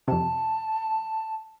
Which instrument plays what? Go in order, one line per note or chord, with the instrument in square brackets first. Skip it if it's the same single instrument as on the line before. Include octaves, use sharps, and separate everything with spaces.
[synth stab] F2 C3 [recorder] A5